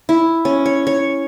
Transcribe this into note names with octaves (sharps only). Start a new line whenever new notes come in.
E4
C#4
C#5
C#5